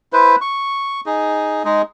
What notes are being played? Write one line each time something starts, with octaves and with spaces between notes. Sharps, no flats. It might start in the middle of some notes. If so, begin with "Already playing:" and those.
E4 B4 C5
C#6
D#4 G#4
G#3 D#4 G#4